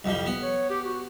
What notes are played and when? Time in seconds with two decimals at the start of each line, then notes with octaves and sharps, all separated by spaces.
0.04 C2 F2 G3
0.26 B3
0.42 C#5
0.70 G4
0.85 F#4